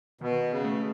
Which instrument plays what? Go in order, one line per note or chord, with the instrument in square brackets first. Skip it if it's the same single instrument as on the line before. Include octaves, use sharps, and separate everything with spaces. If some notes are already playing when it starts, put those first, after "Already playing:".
[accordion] B2 [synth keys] D#3
[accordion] C#3
[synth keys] A3